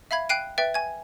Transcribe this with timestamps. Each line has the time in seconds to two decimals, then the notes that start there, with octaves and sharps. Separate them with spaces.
0.11 E5 F5 B5 G#6
0.29 G5 F#6 C7 D7 D#7
0.58 B4 E5 G5 A6
0.74 G#5 G#6